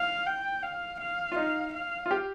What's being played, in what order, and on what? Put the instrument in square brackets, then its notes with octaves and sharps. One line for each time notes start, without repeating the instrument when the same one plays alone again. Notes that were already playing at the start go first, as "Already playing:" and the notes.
Already playing: [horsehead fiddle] F5
G5
F5
F5
[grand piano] F4
[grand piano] D#4 [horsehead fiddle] F5
[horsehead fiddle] F5
[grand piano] F4
G4